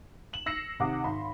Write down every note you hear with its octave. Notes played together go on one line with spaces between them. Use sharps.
E7 F#7
E6 A#6 C7 C#7 E7
C3 D#3 F#5 D6 D#6
G#1 G#2 B5 C6